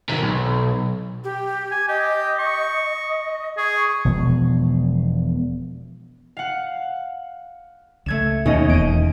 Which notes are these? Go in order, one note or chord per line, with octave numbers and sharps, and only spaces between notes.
C3 D#3
B1
G4
G#5
G4 D#5
C#6
G#4 C#6
E1 B2 F3 G#3
F5 F#5
C#2 A3 G#6 E7
D#2 B2 C#4 D#5
E1 E2 D7 D#7